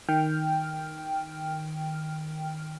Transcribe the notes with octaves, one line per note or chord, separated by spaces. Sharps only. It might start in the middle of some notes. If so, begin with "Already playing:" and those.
D#3 G5 F6